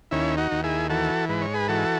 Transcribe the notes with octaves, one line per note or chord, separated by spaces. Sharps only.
D#2 C#4 E4
D#4 F#4
D#2
E4 G#4
E3 F#4 A4
G#2 B4
C#5
G#4 B4
E3 F#4 A4